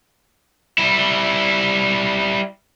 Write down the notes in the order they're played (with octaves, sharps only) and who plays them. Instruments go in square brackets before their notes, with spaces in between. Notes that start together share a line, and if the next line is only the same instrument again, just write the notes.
[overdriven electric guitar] G3 E4